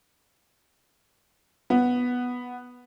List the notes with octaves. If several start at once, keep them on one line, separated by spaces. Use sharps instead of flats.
B3